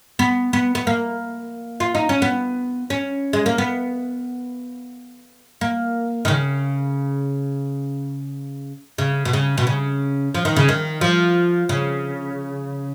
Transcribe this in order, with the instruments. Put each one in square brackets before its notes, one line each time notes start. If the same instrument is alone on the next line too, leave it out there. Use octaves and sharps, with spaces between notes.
[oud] B3
B3
B3
A#3
F4
D#4
C#4
B3
C#4
G#3
A#3
B3
A#3
D#3
C#3
C#3
B2
C#3
B2
C#3
F3
D#3
C#3
D#3
F3
C#3